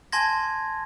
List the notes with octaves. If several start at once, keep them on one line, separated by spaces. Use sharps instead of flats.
G#5 A5 C6 G#6 A#6